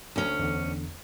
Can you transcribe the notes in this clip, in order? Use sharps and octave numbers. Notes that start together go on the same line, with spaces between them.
D2 C#4
E2 D3